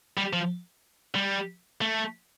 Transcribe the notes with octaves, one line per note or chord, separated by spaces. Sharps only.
G3
F3
G3
A3